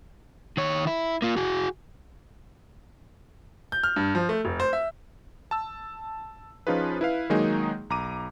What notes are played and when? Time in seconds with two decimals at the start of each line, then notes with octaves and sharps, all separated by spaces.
0.57 D#3 C#5
0.87 E4
1.22 A#3 F4
1.37 F#4 G#4
3.72 G6
3.83 F6
3.96 G2
4.15 F3
4.29 A3
4.45 F1
4.60 C5
4.73 E5
5.51 A5 E6
6.67 F3 C#4 D#4 F4 G#4 B4
7.01 E4 B4 F5
7.30 D#3 F#3 G#3 A#3 D#4 G#4
7.90 B1 A#5 D6 D#7